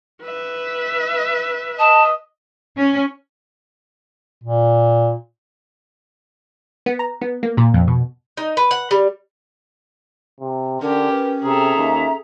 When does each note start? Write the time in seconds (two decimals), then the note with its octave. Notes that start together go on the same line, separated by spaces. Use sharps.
0.23 B4 E5
1.79 D#5 A5
2.77 C#4
4.44 A#2
6.86 B3
6.99 A#5
7.22 B3
7.43 A#3
7.57 A#2
7.74 F2
7.88 B2
8.37 D#4
8.57 B4
8.71 F#5
8.91 G3
10.40 C3
10.81 D3 C#4 G4 A#4
11.12 B4
11.43 C3 G#4 A4 E5 A#5
11.75 D#2